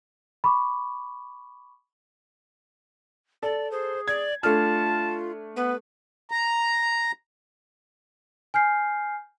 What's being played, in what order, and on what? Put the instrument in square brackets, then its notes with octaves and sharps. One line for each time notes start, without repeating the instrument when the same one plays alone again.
[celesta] B5 C#6 D6
[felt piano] A4 [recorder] D5
[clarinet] G#4 [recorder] C5
[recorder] D5 [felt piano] G#6
[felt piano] A3 D4 F6 [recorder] F4 [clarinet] A5
[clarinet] B3 [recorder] B4
[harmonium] A#5
[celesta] G#5 F6 G6 C7